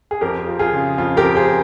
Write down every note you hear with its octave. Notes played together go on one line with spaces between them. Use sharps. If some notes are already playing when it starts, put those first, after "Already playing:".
G#4
F2 G4 A#4
F3
F4 G#4
C#3
F2 F4
G4 A#4
F2
G#4 C5